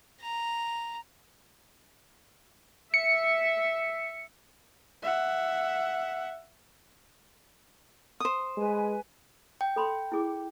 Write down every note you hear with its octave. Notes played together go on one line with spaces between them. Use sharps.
A#5
E5 C#7
E5 F#5
C5 D#6
G#3 B4 G#5
G5
A4 B5 C6
E4 G#4 D6